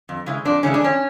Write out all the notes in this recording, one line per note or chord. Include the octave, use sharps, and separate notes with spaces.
F2
C#3 E3 G#3
F2 D4
C#3 E3 G#3 C#4
D4
F2 C#4